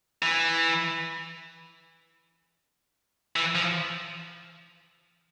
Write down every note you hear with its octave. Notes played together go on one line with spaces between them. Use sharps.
E3
E3
F3